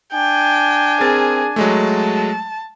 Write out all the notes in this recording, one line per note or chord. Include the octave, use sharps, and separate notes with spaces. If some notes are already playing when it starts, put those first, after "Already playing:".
D4 G5 G#5
C4 G#4 A#4 A6
F#3 G#3 A3 A5